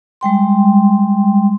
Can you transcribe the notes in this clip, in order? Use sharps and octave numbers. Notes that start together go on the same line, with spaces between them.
G3 G#3 G5 C6